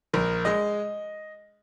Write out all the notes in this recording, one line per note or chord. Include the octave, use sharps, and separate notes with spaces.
A#1 A#4
G#3 D#5